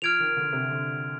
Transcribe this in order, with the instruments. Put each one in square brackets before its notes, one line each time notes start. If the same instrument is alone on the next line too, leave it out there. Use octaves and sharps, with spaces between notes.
[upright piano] F3 [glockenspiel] F6 G#6 D7 F7
[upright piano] D#3
D3
C3
D3